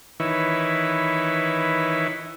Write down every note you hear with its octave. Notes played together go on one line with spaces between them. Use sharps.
D#3 E3 E4 B4 C#5